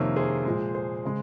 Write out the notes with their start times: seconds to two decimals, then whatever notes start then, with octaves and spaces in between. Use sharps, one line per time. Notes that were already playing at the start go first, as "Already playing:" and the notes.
Already playing: F2 C3 D#3 A#3 A#4 C#5
0.16 G#4 C5
0.45 A#2 F3 G#3
0.75 G#4 C5
1.05 C#3 G#3